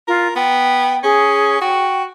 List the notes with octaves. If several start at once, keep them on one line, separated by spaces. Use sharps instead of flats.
F4 A#4
B3 G5
C#4 G#4
F#4 G5